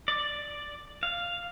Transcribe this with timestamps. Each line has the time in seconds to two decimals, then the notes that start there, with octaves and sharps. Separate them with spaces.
0.08 D5
1.03 F5